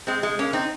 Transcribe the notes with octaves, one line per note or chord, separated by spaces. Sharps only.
G#3 C4
G#3
A#3 C#4
C4 D#4